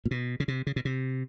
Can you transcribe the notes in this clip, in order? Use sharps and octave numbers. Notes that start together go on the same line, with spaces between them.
A#2
B2
C#3
C3
C#3
B2
C3